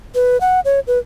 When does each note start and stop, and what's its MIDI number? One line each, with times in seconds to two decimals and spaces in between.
0.15 0.40 71
0.41 0.60 78
0.65 0.80 73
0.87 0.98 71